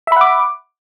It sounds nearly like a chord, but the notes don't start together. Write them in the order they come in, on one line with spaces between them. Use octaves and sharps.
E5 B5 F#5 D6